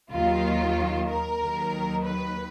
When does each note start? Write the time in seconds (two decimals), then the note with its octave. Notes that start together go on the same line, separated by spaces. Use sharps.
0.13 D#2 D#3 F#3 F4
1.09 A#4
1.40 D#2 D#3 F#3
2.04 B4